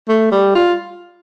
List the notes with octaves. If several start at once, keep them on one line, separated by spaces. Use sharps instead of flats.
A3
G3
F4